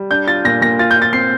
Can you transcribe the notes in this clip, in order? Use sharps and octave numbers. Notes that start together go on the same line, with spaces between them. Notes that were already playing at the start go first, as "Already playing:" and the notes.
Already playing: G3
D4 G6
F4 A6
A#2 A#6
A#2 A#6
F4 A6
G6
F4
A6
C4 C7